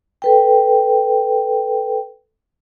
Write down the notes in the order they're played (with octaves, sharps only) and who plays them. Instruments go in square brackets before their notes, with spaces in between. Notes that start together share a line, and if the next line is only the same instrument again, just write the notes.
[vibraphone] A4 B4 G5